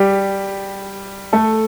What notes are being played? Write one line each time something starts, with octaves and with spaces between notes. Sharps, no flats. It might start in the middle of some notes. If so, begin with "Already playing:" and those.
Already playing: G3 G4
A3 A4